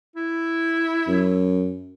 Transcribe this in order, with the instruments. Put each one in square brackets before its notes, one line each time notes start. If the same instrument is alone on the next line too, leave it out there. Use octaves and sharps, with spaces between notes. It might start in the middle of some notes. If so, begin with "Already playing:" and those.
[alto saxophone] E4
[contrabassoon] F#2